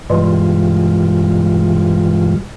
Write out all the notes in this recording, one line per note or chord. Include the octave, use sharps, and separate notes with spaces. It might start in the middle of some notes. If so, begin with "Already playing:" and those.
G2 B2 E3 G3 G#3 F4